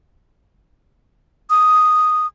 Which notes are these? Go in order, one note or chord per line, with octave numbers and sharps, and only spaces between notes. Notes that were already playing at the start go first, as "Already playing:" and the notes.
D#6